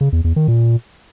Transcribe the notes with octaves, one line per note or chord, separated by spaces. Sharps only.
C#3
E2
E2
D#3
A#2